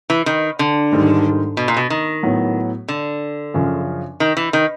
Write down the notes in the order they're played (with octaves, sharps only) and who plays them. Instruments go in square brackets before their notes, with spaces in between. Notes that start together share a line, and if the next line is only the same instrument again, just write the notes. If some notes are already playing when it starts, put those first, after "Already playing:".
[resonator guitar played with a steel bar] E3
D#3
D3
[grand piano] G#2 D#3 G3
[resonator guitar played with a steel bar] B2
A#2
B2
D#3
[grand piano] A2 F#3 B3
[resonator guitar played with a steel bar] D3
[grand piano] F#2 C#3 F3
[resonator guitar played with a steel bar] D#3
E3
D#3